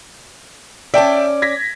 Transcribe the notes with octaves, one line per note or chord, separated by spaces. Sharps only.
C#4 D5 E5 G5 A5
G#6 A#6 B6